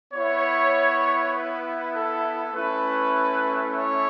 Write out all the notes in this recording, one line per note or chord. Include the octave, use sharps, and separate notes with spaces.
B3 E4 C#5
B4
A4
A3 C#4 E4 B4
C#5